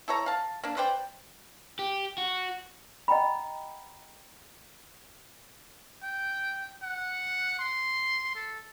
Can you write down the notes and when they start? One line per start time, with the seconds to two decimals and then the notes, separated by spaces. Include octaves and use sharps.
0.08 E4 A4 C#5 A#5
0.26 F5 A5
0.64 A#3 D4
0.77 B4 C5 D5 G5
1.79 G4
2.18 F#4
3.08 D#5 F#5 G5 A#5 B5
6.03 G5
6.83 F#5
7.58 C6
8.35 A4